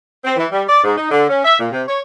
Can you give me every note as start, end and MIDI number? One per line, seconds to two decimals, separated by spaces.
0.25 0.35 60
0.36 0.46 52
0.52 0.62 55
0.68 0.82 74
0.84 0.94 44
0.98 1.06 63
1.11 1.25 50
1.30 1.40 61
1.45 1.58 76
1.59 1.68 46
1.71 1.82 48
1.88 2.01 73